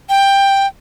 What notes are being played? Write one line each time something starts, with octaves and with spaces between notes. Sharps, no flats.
G5